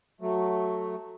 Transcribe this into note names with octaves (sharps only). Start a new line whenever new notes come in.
F#3 A3